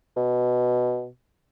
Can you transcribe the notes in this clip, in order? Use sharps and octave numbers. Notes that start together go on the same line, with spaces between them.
B2